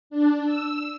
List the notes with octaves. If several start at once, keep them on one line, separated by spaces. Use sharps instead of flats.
D4
E6